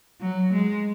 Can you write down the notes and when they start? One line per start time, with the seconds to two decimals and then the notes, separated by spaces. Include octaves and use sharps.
0.21 F#3
0.53 G#3